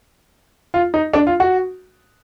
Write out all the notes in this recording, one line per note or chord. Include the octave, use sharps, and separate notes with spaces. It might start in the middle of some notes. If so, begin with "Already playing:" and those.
F4
D#4
D4
F4
F#4